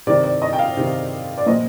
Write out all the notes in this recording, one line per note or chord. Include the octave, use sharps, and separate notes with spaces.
C3 D#3 D5
D5
D#5
G5
F5
C3 D#3
D5
A#2 F3 D#5